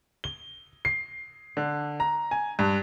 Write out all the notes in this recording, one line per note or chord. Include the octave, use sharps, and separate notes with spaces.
G7
C7
D3
A#5
G#5
G2